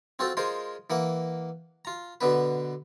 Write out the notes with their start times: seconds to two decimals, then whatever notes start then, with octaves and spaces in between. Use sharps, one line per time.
0.19 C4 F4 F#4 A4 C5
0.37 G#3 F4 G#4 A#4 C5
0.90 E3 A#3 F#5
1.85 F4 A#5
2.21 B2 D3 B3 B4